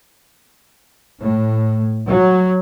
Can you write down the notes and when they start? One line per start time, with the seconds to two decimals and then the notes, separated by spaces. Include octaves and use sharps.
1.20 A2
2.09 F#3